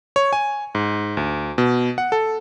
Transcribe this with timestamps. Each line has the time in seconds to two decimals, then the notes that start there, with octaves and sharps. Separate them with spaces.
0.16 C#5
0.33 G#5
0.75 G#2
1.17 D2
1.58 B2
1.98 F#5
2.12 A4